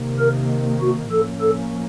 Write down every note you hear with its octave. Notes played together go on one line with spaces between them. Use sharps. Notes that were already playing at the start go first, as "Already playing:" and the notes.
Already playing: C3 D#3 A#3
A#4
F#4
A2 F3 A#3 C#4 A4
A4